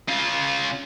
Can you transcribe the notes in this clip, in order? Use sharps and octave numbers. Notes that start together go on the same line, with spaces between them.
C#3 F4